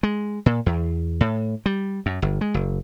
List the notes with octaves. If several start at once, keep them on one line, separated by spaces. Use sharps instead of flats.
G#3
A#2
E2
A2
G3
F#2
G1
G#3
F#1